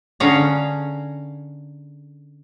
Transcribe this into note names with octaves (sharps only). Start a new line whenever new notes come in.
D3 C#4 G#4 F5 A#5